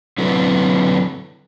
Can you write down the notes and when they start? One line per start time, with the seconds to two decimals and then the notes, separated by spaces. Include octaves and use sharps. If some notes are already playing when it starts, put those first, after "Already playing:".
0.18 D3 F#3 C4 E4 A4 B4